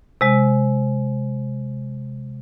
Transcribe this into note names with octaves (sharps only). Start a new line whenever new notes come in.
C3 G#3